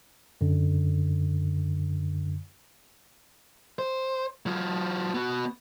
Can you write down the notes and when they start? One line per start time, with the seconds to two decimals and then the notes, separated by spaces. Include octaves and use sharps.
0.41 F#2 D3
3.79 C5
4.46 F#3 F4
5.14 B3 F#4